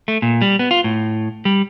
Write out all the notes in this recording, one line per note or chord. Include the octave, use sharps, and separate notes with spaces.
A3
A#2
G3
B3
F4
A2
G3